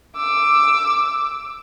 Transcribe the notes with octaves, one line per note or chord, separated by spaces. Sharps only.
D6 E6